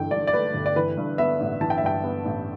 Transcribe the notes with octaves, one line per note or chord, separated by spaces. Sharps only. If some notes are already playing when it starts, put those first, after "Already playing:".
Already playing: G1 G2 E3 A3 G5
G2 D5
D5
A3 B4
G1
D5
E3 B4
G2
B3 E5
A1
E3 A5
G5
E5
G2 G5
B3
A1